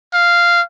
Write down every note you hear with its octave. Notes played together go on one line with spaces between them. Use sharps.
F5